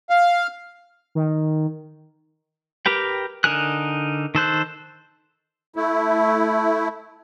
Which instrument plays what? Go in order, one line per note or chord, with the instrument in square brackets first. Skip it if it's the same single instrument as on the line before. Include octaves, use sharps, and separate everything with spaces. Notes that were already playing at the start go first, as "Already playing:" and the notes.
[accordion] F5
[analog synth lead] D#3
[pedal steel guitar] G4 A#4 B4 G5
D3 D#4 A#4 G#5 F#6
D#3 A4 C5 F#6
[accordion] A3 E4